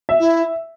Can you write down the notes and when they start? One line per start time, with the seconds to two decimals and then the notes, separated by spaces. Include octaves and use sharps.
0.09 E5
0.20 E4